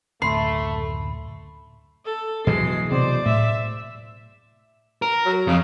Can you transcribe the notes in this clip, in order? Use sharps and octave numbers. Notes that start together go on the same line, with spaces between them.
F#1 D2 A2 A3 B5 C6
A4
B2 E3 F#3 G#3 C7
C3 C5 D5
A2 E5
A#4
F#3
F2 C#3